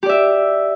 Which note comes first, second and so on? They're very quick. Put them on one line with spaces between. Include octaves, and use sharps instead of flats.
G4 D5 E5